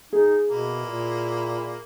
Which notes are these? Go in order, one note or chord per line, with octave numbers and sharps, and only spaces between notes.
D#4 G#4
B2 A#3 E4
A#2